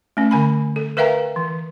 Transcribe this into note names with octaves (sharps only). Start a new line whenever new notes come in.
A3 C#4
D3 G#5 B5
A4
A#4 B4 E5 F5 G5 A#5
E3